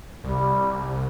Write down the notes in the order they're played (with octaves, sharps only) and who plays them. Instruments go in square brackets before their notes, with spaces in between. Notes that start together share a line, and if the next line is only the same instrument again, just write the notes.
[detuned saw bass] C2 [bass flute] G3